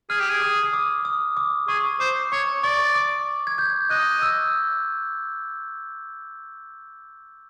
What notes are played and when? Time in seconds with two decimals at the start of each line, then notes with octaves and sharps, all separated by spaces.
0.10 G#4 F6
0.20 G4
0.30 G#4
0.42 D#6
0.63 D#6
0.73 D6
1.05 D#6
1.37 D6
1.68 G#4 C#6
2.00 C5 D6
2.32 C#5 C#6
2.63 D5 C#6
2.95 D6
3.47 G#6
3.58 G6
3.90 D#5 F#6
4.22 E6